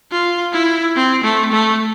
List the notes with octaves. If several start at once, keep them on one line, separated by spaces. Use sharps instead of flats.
F4
E4
C4
A3
A3